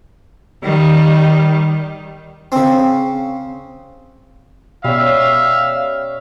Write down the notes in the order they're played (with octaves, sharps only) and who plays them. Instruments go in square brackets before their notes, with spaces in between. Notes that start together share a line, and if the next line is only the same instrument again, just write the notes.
[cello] D#3 G3
[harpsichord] C#3 C4
[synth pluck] B2 [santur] G3 C#4 [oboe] E5 [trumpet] F5